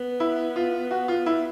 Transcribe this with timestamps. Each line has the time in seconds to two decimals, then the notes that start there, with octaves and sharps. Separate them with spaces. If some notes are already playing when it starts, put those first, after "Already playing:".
Already playing: B3
0.20 E4
0.56 F4
0.91 F#4
1.08 F4
1.26 E4